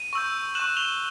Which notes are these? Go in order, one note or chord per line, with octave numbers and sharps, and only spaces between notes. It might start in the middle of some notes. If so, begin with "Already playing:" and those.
Already playing: D#7 F7
C#6 E6 G6
C#6 F#6 E7 F#7
F7 G7